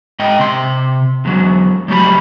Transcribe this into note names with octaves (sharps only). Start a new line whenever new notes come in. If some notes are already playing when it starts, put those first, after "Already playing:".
G#2 D#5 G5
C3 C6
E2 F#3
F3 F#3 A3 G4 B5